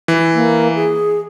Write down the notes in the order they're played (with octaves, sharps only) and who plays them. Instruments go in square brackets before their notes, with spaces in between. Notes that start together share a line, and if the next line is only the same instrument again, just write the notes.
[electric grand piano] E3
[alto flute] A#3
G#4